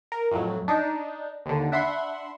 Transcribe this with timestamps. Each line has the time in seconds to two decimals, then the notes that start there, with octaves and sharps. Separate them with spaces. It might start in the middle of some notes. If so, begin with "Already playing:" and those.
0.12 A#4
0.32 F2 A2 F#3
0.68 D4 D#4
1.46 D#2 D3
1.72 D4 E5 F#5 B5 C6